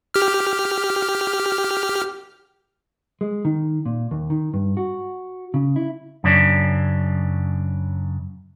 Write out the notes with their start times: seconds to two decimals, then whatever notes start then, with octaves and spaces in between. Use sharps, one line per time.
0.14 G4 F6
3.21 G#3
3.45 D#3
3.86 A#2
4.11 D#2
4.30 D#3
4.54 G2
4.77 F#4
5.54 C#3
5.76 E4
6.24 F#2 C#3 D4